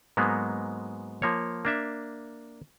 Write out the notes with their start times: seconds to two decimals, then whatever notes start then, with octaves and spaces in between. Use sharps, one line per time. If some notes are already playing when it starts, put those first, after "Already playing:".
0.17 G#2 F#3 G#3 A#3 B3
1.22 F3 A#3 C#5
1.65 A#3 D4 E5